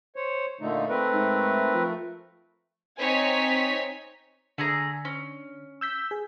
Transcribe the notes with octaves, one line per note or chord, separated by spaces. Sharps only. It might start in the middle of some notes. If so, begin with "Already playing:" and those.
C5 C#5
A#2 D3 A3 D#4
C4 A#4 B4
G#2
F3
C4 D#4 C#5 G#5 B6
D3 A3 G#4 A#5
C#4
E6 G6 B6
G#4